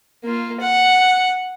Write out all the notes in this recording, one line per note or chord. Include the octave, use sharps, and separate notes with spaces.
A#3 F4
F#5